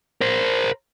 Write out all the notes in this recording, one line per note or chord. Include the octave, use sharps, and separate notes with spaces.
A#4 C5